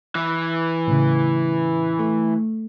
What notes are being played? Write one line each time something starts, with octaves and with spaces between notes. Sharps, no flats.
E3
A2 C#3
A3